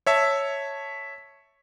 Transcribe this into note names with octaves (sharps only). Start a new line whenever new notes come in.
C#5 E5 A5